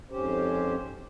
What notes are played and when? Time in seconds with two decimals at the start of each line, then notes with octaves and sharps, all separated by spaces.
0.11 F2 G#2 C#4 G4 C5